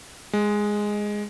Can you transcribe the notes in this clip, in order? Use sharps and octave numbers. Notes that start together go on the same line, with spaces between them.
G#3